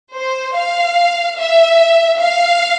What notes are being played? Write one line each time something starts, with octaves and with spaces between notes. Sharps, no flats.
C5
F5
E5
F5